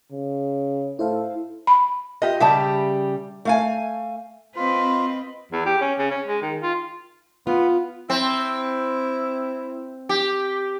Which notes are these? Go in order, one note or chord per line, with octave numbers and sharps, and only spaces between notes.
C#3
A2 A3 E4 A4 C5 F5
B5
F4 G4 D#5 E5
C#3 G3 G4 E5 A5
A3 F5 G#5
C4 F4 B4 D#5
E2
G4
C#4
C#3
C#4
G#3
D#3
F4
B3 F4
C4 E4
G4